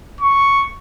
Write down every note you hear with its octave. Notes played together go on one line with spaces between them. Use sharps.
C#6